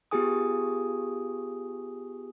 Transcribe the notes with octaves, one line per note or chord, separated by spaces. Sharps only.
B3 F4 G4 G#4 G#5 D#6